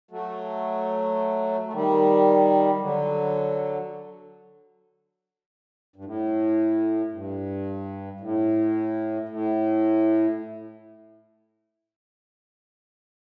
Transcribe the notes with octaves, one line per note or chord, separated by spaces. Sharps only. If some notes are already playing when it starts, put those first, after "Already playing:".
F#3 A3
A3
D#3 G3
D3 F#3
G2
A2
G2
A2
A2